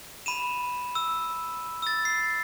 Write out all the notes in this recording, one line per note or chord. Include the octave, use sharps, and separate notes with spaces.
B5 D#7 E7
E6
E6 A6
C7